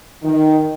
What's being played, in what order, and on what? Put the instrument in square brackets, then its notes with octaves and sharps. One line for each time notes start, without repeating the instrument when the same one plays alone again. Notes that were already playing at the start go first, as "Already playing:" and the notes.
[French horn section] D#3